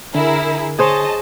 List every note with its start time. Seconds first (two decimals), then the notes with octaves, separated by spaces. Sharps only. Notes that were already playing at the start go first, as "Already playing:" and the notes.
0.15 D3 E4 G#4 A#4
0.79 G#4 C5 C#5 D#5 A5